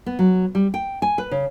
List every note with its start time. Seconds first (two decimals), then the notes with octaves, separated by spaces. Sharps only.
0.06 B3
0.19 F#3
0.55 G3
0.74 G5
1.02 G#5
1.18 B4
1.31 C#3